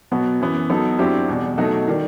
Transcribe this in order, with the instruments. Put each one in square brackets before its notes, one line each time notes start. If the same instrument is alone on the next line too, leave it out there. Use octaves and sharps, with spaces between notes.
[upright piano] B2 F#3 B3 F#4
F#2 E3 B3
F#3 B3 D#4 A4
G2 F#3 C4 E4 G4
E2 B2 G3
B2 F#3 A3 D#4 F#4
D#3 G3